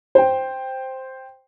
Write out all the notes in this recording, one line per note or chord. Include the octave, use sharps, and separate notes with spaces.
C5 G5